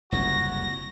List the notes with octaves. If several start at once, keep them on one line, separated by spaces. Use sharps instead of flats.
F#1 C2 F2 F#4 A#6